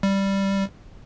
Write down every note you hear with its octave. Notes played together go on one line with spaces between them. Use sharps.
G3